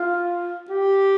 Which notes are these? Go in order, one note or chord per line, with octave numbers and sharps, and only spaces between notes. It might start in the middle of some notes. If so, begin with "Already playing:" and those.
Already playing: F4
G4